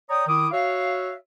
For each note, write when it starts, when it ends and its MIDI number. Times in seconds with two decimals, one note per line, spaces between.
0.09 0.24 73
0.09 0.24 74
0.09 0.24 79
0.09 0.24 82
0.09 0.24 87
0.27 0.46 51
0.27 0.46 64
0.27 0.46 86
0.27 0.46 87
0.52 1.12 66
0.52 1.12 73
0.52 1.12 76
0.52 1.12 77